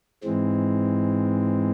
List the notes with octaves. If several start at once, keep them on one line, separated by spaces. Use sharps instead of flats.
G#2 E3 G#3 C4